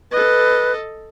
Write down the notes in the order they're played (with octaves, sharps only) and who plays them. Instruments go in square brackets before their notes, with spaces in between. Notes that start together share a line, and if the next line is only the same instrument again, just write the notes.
[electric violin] A4 D#5 [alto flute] B4